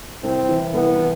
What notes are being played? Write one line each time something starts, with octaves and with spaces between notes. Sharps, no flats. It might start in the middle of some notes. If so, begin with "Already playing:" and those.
C2 C4
E3
C2 B3
E3